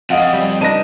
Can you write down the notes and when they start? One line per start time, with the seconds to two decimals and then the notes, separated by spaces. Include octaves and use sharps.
0.10 F2 D#5 F5 F#5
0.33 G3
0.61 D4 D#4 B4 A#6 D#7